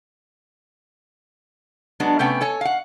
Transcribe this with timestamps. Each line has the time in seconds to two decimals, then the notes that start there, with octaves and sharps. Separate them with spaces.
2.00 F#3 G#3 B3 D4
2.19 C3 A3 B3 C#4 G5
2.41 A4 C#5 G#5
2.61 F5 F#5